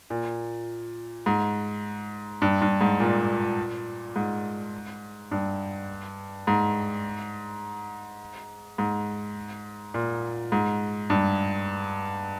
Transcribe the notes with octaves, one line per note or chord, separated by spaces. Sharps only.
A#2
G#2
G2
G2
G#2
A#2
G#2
G2
G#2
G#2
A#2
G#2
G2